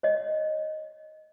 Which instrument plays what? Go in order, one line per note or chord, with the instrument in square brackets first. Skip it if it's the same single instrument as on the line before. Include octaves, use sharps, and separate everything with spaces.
[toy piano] C#5 D#5